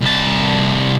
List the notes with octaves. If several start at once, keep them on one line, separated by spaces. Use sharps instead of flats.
C2 A5